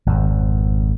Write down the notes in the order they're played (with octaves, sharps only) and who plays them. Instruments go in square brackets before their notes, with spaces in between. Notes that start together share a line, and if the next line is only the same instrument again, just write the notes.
[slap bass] G#1 F2